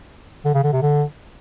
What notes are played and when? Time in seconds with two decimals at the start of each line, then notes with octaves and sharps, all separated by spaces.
0.45 D3
0.54 C#3
0.64 D3
0.73 C3
0.82 D3